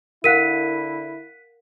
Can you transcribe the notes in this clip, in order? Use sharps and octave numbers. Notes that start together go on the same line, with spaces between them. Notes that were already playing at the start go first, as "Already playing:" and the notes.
D3 E4 A#4 F5 F#5 F#6 B6 D#7